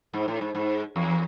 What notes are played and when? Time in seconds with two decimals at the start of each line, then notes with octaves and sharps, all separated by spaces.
0.13 G#2
0.28 A2
0.41 G#2
0.55 G#2
0.96 E2